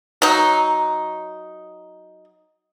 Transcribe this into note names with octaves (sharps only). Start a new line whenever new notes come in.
F#3 D#4